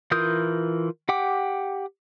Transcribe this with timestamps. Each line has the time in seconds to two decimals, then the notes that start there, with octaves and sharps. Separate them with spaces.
0.11 E3 F4 A#4 D#6 G6
1.09 G4 F#5 G5 D6